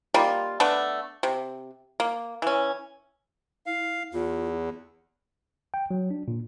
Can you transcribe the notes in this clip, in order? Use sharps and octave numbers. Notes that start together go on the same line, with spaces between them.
G3 A#3 D#4 F4
A3 B3 D4
C3
A#3
E3 C#4
E4 F5
E2 F4
G5
F#3
D4
A#2